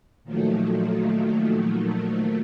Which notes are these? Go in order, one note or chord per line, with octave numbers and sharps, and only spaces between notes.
A#2 D#3 F3 F#3 A3